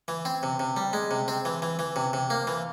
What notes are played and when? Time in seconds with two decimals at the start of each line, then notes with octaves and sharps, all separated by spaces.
0.08 E3
0.25 C4
0.43 C3
0.59 C3
0.77 G3
0.93 G#3
1.11 C3
1.28 C4
1.45 E3
1.62 E3
1.79 E3
1.96 C3
2.13 C3
2.30 A#3
2.47 E3